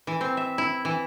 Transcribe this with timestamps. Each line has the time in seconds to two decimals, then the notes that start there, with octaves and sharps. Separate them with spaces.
0.07 E3
0.21 C4
0.37 E5
0.58 E4
0.85 E3